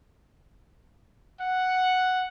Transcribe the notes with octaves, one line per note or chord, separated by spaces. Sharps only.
F#5